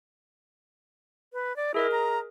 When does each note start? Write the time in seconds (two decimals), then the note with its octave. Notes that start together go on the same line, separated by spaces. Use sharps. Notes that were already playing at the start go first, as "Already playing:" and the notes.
1.33 B4
1.56 D5
1.74 E4 G#4 A#4 D#5
1.92 A#5